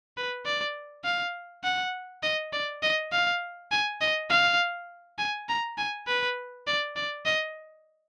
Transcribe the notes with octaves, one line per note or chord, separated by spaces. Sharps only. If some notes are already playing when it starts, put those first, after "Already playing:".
B4
D5
F5
F#5
D#5
D5
D#5
F5
G#5
D#5
F5
G#5
A#5
G#5
B4
D5
D5
D#5